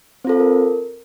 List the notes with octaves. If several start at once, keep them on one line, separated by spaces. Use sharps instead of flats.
C4 F4 A4 C5
A#4